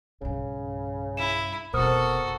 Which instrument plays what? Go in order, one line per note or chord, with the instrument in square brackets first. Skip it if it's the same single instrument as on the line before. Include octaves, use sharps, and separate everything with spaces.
[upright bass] B1 G2 [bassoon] C#3
[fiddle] E4 [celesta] E7
[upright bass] F1 B2 [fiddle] F#4 A4 [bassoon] A#4 [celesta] C5 D#6 F6